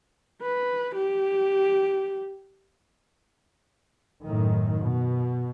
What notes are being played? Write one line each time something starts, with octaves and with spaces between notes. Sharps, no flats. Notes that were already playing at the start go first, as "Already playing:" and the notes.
B4
G4
F#2 A2 D#3
B2